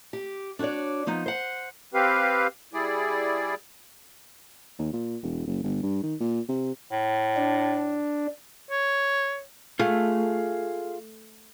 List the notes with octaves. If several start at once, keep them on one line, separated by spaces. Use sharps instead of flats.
G4
D4 F#4 B4 C#5 D5
F3 B3 D#4
C5 F#5
C4 G4 B4 F5
G3 E4 G#4 D5
D#2
A#2
E1
F#1
G1
G2
D#3
A#2
C3
A2
D4
C#5
A3 F4 G#4 F5